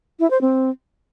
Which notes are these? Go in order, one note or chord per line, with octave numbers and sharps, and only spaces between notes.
E4
C5
C4